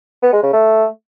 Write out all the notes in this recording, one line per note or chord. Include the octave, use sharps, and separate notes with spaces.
B3
G#3
C#3
A3